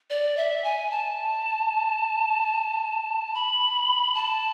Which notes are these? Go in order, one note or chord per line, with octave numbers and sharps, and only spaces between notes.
D5
E5
G#5
A5
B5
A5